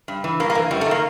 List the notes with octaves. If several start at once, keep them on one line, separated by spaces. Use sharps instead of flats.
G2
E3
G2 A#3
A#3
E3
F#2 G3
A3
D#3 A#3